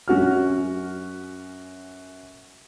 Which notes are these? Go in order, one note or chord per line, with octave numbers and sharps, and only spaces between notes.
F#2 C#4 F#4 F6